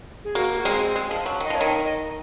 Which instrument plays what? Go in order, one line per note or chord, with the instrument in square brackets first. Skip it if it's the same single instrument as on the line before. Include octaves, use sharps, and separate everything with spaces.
[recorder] G#4
[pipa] A#3 [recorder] F#4
[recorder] F#4
[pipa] G#3 C4 [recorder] G#4
[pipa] G#3
F3
F#3
D#3
[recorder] D#5
[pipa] F3
[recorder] C#5
[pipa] D#3
[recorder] D#5